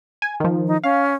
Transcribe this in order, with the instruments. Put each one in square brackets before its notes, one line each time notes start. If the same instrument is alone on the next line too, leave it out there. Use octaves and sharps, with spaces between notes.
[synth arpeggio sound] G#5
D#3 F3
[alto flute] D#4
[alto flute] C#4 [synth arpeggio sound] F5